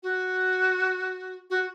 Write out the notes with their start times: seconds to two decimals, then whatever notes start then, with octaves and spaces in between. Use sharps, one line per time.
0.03 F#4
1.50 F#4